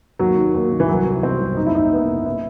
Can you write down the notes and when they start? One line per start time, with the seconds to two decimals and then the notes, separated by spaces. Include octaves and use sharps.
0.19 D#2 F#3
0.38 D#3
0.54 D#2
0.72 D#3
0.80 E3
0.88 C2 F#3
1.06 C3
1.23 C2 C4
1.40 C2
1.57 F#1 D#4
1.66 E4
1.75 F#1 D#4
1.92 F#2 B3
2.09 F#1
2.26 E4